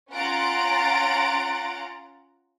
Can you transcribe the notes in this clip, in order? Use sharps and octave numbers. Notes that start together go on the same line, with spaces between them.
C#4 F4 F#5 A#5 A6 D7